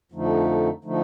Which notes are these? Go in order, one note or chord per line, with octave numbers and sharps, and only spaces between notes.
F2 D3 F3 A3 D#4
D3 F3 A3 D#4